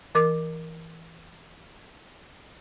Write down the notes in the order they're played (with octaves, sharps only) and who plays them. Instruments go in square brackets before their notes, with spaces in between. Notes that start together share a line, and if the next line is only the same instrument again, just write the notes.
[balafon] E3 A#4 D6